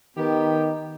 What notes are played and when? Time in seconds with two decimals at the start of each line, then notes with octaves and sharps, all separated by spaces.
0.17 D#3 B3 G4